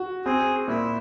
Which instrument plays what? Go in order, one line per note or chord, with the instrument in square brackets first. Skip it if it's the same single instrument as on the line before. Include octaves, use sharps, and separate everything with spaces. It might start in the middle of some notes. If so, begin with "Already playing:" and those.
Already playing: [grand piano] F#4
[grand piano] C4 [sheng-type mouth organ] G#4
[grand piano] A#2 [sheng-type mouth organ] E4